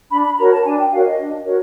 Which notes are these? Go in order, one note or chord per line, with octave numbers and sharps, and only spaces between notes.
D4 B5
B5
F#4 A#4 C#5 A#5
A5
D4 G#5
G5
F#4 A#4 C#5 F5
D#5
D4
F#4 A#4 C#5